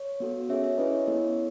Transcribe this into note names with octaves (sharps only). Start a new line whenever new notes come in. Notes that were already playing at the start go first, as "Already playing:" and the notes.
Already playing: C#5
B3 F#4 A4
C#4 G#4 C#5 E5
C#5 E5
C#4 E4 G#4 B4 D#5
C#5
B3 E4 A4